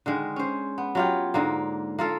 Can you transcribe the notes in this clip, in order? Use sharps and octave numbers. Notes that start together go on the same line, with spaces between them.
D3 D#3 G#3
C#4 C5
B3
F#3 F4 G4
G#2 D3 A#3
A#3 F4 A4